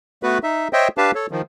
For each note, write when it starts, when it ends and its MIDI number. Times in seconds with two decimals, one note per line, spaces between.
0.23 0.38 57
0.23 0.38 59
0.23 0.38 66
0.23 0.38 71
0.43 0.68 63
0.43 0.68 76
0.73 0.88 72
0.73 0.88 73
0.73 0.88 75
0.73 0.88 76
0.73 0.88 79
0.98 1.11 62
0.98 1.11 67
0.98 1.11 71
0.98 1.11 77
0.98 1.11 81
1.15 1.26 69
1.15 1.26 73
1.31 1.42 51
1.31 1.42 53